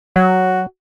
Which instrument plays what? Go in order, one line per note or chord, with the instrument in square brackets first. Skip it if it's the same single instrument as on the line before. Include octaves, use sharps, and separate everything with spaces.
[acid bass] F#3 [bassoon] F#4